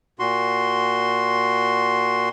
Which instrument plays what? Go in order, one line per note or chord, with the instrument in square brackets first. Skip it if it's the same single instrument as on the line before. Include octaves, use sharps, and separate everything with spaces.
[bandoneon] A#2 F#4 C6